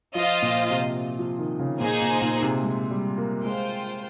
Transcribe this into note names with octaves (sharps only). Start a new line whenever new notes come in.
F3 F4 C5 D#5
A#2
C3
F3
D#3
C#3
A#2 A#3 D#4 G#4 C5
A#2
A#2
C3
G#3
G3
A#3
G#3 F4 C5 G5